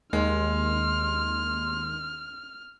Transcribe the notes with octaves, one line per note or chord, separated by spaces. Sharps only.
D#2 G#3 C6 F6